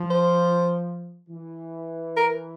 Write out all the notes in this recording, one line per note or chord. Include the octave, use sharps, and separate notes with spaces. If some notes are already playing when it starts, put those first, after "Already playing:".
Already playing: F3
C5
E3
A#4